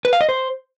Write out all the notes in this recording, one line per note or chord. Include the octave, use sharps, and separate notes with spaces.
B4
F5
D#5
C5